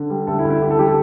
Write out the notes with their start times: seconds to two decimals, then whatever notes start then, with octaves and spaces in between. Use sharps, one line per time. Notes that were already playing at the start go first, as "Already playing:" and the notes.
Already playing: D3
0.10 G3
0.27 D2 A4
0.39 E4
0.45 D2
0.50 E4
0.62 D3 G4
0.71 A4
0.79 G3 G4
0.88 A4